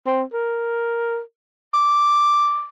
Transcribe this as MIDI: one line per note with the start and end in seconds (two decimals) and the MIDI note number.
0.07 0.23 60
0.33 1.20 70
1.74 2.67 86